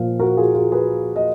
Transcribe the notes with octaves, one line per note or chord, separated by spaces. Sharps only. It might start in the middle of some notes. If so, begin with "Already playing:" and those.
Already playing: A#2 F3 F5
F#4 A#4
F4 G#4
F4 G#4
G#4 B4
D#5